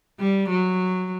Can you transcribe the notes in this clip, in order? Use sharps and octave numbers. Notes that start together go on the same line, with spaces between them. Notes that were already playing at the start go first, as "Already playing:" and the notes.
G3
F#3